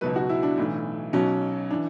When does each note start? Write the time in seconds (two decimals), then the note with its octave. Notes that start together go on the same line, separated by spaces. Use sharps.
0.01 C#2 B2 F#3 B4
0.16 F#4
0.29 E4
0.43 D4
0.58 B1 A2 E3
1.13 B1 B2 F#3 C#4
1.70 E3 D4